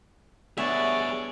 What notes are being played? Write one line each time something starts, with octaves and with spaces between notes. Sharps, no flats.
G3 B3 D4 G#4 C#5 D5 E5